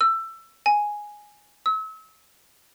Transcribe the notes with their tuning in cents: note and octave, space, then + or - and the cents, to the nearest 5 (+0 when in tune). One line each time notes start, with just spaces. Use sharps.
E6 +20
G#5 +0
E6 -35